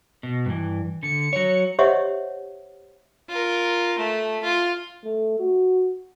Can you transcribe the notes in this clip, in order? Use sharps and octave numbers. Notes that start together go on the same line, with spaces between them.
B2
G2 E3
D3 C#7
F#3 C#5
G4 C5 C#5 D#5 E5 F#5
F4 A#4
A3
F4
A3
F#4